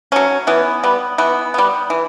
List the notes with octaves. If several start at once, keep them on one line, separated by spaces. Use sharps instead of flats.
F#3 A3 C#4
E3 B3
G3 B3
E3 B3
G3 B3
E3